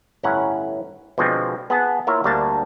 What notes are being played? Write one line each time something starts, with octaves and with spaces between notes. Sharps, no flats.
G1 A2 C#4 E4 F#5 A#5
B2 D3 F3 G#3 C4
B3 G#4 F#5 A5
A#3 E4 F4 A#4 C#5 E5
D2 G3 A#3 D4 A5 A#5